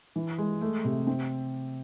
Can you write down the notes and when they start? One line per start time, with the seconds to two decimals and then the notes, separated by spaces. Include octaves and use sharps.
0.16 E3
0.38 G#3
0.61 A3
0.85 C3
1.07 C4